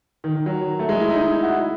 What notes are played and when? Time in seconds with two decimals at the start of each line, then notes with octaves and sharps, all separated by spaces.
0.24 D#3
0.35 D#3
0.46 F#3
0.79 A3
0.89 G#3
1.00 E4
1.10 D#4
1.21 D#4
1.32 E4
1.43 F#4
1.53 E4